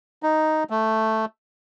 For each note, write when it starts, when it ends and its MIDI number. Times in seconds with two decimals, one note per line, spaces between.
0.23 0.64 63
0.70 1.25 57